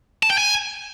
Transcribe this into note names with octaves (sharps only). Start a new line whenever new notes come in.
A5
G5
G#5